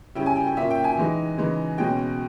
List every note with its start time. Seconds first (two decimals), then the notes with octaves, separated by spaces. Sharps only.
0.15 C#3 G3 C#4 E4 G5
0.26 G#5
0.36 G5
0.47 G5
0.56 A#2 A#3 C#4 E5
0.71 G5
0.84 G#5
0.97 E3 G#3 D#4
1.38 C#3 E3 G#3 D#4
1.78 B2 G#3 C#4 G5